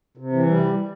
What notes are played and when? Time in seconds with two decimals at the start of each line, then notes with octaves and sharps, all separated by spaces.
0.17 C3
0.33 E3
0.46 G3